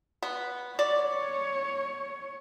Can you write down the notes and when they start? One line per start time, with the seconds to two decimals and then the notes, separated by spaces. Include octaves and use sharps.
0.23 B3
0.79 C#5 D5